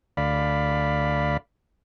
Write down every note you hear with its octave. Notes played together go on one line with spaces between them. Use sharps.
D2 D5 F5 B5